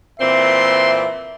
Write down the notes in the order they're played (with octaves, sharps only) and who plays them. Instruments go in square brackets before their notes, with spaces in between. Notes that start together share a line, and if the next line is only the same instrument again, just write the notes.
[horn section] A#2 E3 C4 [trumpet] E5 [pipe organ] C6